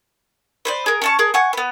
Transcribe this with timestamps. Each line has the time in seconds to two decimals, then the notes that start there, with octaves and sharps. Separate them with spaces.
0.65 B4 C5 D5
0.86 G#4 A#4
1.02 C#4 A5 C#6
1.19 G#4 A#4
1.34 F#5 G#5 C#6
1.53 B3 B4